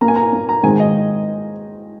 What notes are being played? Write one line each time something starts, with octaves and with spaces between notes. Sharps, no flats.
A#2 A#3 A#5
G#5
A#5
A#2 A#3
A#5
G#2 D#3 C4 G#5
D#5